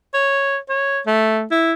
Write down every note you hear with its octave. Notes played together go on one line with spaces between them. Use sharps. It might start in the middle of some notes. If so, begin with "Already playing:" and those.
C#5
C#5
A3
E4